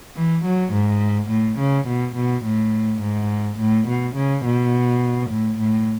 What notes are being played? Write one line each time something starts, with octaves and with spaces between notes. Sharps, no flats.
E3
F#3
G#2
A2
C#3
B2
B2
A2
G#2
A2
B2
C#3
B2
A2
A2